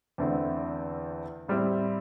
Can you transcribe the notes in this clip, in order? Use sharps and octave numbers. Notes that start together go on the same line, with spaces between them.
E2 D3 A3 C4 E4
A2 G3 C4 E4